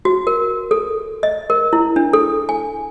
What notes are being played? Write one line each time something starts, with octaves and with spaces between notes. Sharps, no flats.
F#4
A#4
A4
D#5
A#4
E4
D4
A4
G#5